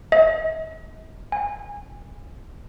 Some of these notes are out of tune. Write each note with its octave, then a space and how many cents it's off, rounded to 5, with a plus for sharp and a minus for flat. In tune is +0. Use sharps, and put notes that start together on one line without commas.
D#5 +45
G#5 -25